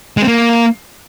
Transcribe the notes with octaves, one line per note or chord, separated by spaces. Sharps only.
G#3
C4
A#3